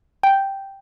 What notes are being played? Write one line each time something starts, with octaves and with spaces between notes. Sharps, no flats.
G5